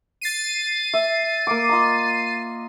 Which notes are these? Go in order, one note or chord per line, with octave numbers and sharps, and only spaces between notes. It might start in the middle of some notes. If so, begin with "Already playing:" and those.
A6 C7 D#7
E5
A#3 D6
F4 D#5 A#5